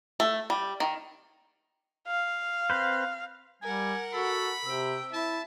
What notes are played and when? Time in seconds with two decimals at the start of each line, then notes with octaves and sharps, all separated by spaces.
0.20 A3
0.50 G3
0.80 D#3
2.07 F5
2.70 C4 B4 C5
3.62 G3 A#4 F#5 G#5
4.13 F#4 A4 B5
4.65 C3 C4 G5 E6
5.13 E4 E5 A5